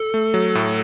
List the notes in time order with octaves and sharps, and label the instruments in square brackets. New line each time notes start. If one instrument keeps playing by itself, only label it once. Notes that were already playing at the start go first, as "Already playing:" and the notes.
Already playing: [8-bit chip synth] A4
[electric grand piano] A3
F#3
A2